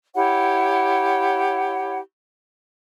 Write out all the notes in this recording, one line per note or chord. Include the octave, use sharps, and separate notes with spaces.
E4 G4 C#5 F#5